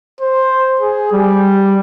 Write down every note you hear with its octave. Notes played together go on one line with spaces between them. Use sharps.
C5
G#4
G3